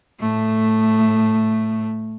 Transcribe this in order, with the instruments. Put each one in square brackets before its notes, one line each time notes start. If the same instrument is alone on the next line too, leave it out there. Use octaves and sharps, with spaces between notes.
[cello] A2 A3